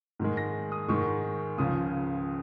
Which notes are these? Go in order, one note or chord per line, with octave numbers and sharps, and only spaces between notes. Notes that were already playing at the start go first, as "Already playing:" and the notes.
G#2 D#3 G#3
A#6
D#6
G#2 D#3 G#3 C#6
C#2 C#3 F3 D#6